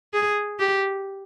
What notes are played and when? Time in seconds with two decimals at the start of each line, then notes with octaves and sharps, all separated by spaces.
0.14 G#4
0.59 G4